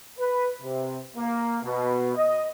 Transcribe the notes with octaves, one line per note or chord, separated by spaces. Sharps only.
B4
C3
A#3
B2
D#5